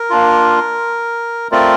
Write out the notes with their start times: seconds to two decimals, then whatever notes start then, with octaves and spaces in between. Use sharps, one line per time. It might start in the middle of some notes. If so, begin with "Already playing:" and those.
Already playing: A#4
0.10 A#3 D4 F4
1.51 A3 C4 F4 A#4 D5